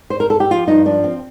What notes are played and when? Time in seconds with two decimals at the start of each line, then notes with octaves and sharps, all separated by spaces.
0.10 C5
0.20 A#4
0.30 A4
0.40 G4
0.50 F3 F4
0.68 G2 D#4
0.86 F3 D4
1.04 C4